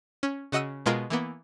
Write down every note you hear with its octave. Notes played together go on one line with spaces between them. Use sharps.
C#4
C#3 F#4 D#5 F#5 E6 D#7
B2 G#3 F4 A#4
E3 A#3 B3